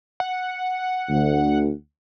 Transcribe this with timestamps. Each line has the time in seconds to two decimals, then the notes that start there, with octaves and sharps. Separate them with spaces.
0.20 F#5
1.10 D2